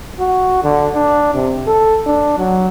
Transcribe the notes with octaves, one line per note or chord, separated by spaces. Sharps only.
F#4
D3
D4
C3
A4
D4
F#3